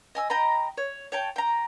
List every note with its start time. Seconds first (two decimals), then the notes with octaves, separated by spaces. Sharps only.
0.15 D#5 G#5 E6
0.30 D#5 G5 A#5 B5
0.77 C#5
1.12 C#5 G5 A5
1.36 G5 A#5